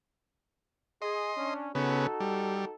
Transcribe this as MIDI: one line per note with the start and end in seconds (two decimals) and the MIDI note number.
1.02 1.32 68
1.02 1.54 75
1.02 1.54 84
1.37 1.71 61
1.37 1.71 62
1.75 2.07 49
1.75 2.07 59
1.75 2.75 63
1.75 2.75 66
1.75 2.75 69
2.20 2.65 55